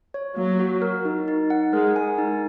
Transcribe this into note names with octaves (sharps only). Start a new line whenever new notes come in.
C#5
F#3 A#3
F#4
A#4
D#4
D#4
F#5
G#3 A#4
G#5
D#4